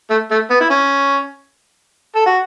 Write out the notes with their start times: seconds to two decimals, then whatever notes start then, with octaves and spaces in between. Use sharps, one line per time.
0.10 A3
0.31 A3
0.50 B3
0.61 E4
0.70 C#4
2.15 A4
2.26 F#4